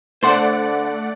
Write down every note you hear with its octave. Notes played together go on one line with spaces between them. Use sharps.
D3 A3 C5 D5 F#5 C6